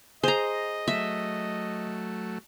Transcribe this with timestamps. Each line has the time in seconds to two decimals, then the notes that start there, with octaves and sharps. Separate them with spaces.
0.24 G#4 C5 D#5 A#5
0.88 F#3 A3 E5